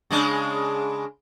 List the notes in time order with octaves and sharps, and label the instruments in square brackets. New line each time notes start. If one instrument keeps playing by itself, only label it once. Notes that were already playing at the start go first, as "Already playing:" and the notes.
[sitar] C#3 G#3 D4